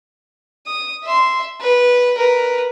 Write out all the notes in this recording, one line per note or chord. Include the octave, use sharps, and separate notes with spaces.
D#6
E5 C6
B4
A#4 B4